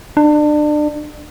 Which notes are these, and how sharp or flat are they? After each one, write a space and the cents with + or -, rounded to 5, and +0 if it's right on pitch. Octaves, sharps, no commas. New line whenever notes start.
D4 +30